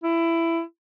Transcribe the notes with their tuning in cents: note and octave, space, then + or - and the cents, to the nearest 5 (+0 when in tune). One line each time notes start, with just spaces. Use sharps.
E4 +15